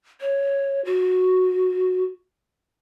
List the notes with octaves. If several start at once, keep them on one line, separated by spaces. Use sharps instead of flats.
C#5
F#4